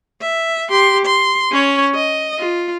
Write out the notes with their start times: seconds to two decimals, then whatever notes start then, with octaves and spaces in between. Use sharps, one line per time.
0.21 E5
0.70 G4 C6
1.05 C6
1.52 C#4 C#5
1.94 D#5
2.39 F4